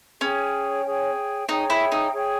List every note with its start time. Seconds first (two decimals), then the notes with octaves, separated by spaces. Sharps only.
0.21 C#4 G#4 C#5 G5
0.85 G#4 C#5 G5
1.48 D#4 G#4 C#5 G5
1.70 E4
1.92 D#4
2.12 G#4 C#5 G5